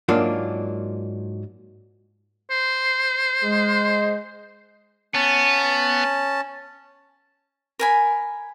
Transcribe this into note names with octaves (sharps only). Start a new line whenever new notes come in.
G#2 F#3 A#3 D4 F4
C5
G#3
B3 C#4 A5
A#4 G#5 B5